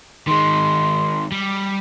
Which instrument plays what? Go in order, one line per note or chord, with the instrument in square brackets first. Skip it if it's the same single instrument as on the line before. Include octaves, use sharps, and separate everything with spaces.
[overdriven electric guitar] D#3 G#3 [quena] C6
[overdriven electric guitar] G3